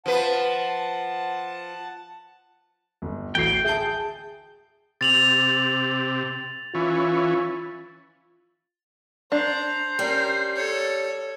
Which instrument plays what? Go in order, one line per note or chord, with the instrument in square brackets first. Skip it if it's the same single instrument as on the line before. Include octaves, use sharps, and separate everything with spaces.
[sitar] F3 B4 [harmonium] F#5 A5
[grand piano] G1
[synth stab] A1 E3 [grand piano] D2 F#4 C7 [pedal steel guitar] G5
[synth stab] G#4 G6 [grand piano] E5 A5
[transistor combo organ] C3 [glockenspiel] A6 F7 F#7
[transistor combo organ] E3 C#4 [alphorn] F4
[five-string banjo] D4 [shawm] C5 [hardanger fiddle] A#5
[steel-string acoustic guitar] G3 G5 [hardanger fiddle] C#4 A#4
[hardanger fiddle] A4 C#5